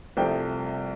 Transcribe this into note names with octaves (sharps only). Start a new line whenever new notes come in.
C2 C3 F3 A3 G5